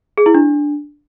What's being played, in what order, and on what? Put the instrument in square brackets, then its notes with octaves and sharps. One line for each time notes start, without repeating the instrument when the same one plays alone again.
[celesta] G#4
E4
D4